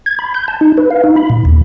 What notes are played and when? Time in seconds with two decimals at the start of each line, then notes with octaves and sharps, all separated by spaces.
0.06 G#6
0.19 B5
0.34 G6
0.48 A5
0.61 D#4
0.77 B4
0.90 F5
1.04 D#4
1.16 B5
1.30 A#2
1.45 D#2